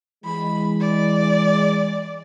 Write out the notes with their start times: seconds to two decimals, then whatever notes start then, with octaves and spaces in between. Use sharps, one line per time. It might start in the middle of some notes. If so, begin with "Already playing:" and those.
0.24 E3 G#3 B5
0.81 D5